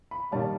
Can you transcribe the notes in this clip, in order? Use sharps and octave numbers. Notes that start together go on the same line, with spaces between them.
B5
D#3 G3 A#3 A5